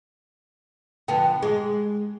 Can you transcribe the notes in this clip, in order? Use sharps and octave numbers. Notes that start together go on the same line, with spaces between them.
D3 F3 B3 G5
G#3 G#4